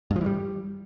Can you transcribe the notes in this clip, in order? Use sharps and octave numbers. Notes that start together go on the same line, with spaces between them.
G2
F3
E3
G3